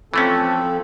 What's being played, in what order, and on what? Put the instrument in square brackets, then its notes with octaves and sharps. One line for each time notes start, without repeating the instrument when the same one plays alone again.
[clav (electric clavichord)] E3 A3 C#4 [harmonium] F3 C4 A4